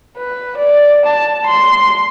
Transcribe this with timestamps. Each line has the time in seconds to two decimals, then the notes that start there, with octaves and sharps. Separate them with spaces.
0.18 B4
0.58 D5
1.06 A5
1.47 C6